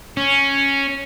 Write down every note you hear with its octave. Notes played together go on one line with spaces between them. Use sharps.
C#4